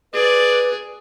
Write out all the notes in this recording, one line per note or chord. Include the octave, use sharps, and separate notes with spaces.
G#4 B4 D5